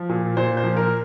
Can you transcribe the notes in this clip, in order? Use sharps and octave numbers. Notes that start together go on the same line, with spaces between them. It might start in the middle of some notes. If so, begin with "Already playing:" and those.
Already playing: F3
A#2
A#2 C5
C5
F3
A#4